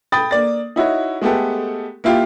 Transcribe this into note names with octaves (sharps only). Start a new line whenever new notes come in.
G5 B5 D#6 A6
A#3 D5 A6
D#4 E4 F#4 C#5
G#3 A3 B3 G4 A4
A#3 E4 F4 G4 F5